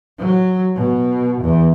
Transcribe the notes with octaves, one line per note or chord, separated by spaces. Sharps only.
F#3
B2
E2